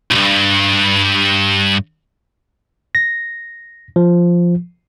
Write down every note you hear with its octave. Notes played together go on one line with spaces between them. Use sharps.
B1 G2
A#6
F3